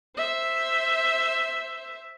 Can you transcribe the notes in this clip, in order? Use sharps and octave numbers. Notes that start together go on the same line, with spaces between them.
C5 E5